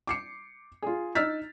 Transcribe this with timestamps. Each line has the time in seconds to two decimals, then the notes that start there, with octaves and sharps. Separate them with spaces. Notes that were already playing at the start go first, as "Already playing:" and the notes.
0.07 D6 C7 C#7
0.82 F4 G#4
1.15 D#4 E6 F6 A6 B6